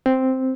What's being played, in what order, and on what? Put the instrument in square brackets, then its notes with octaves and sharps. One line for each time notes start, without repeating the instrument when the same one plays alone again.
[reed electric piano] C4